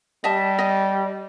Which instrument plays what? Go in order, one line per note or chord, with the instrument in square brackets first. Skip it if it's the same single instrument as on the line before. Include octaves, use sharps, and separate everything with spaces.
[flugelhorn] G3 [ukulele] D#5 E5 A5
[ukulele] D#5